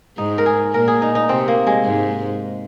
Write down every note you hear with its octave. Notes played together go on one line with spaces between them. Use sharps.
G#2 D#4
A#4
G#4
A#2 A#4
G#4
D#4
D#4
C3 C4
A#3
G#3
G#2